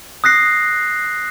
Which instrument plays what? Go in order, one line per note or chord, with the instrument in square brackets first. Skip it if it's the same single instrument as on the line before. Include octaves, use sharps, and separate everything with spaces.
[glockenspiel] D#6 F#6 A#6 C7